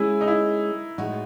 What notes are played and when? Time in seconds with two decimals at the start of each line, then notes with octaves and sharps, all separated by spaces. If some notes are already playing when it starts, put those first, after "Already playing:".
Already playing: G#3 C#4 E4 G#4
0.21 D#4
0.28 E4
0.98 A2 G#3 D#4 F#4